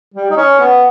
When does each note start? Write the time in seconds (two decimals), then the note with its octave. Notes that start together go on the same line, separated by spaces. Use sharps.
0.14 G3
0.30 D#4
0.36 C#4
0.59 B3